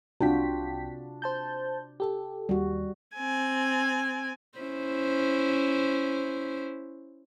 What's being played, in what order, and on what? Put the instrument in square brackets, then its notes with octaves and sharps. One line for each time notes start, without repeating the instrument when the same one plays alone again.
[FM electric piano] C2 G5 B6 [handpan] C3 F4 F#4 [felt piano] D4
[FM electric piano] C5 A5 G6
G4 A4
[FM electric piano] D#2 [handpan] G3 F#4
[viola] C4 G#5
[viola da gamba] C#4 E4 C5